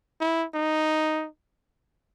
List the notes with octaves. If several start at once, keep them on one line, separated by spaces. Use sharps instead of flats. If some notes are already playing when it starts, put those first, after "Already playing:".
E4
D#4